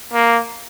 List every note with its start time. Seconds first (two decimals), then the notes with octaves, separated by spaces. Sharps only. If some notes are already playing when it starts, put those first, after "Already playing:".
0.14 A#3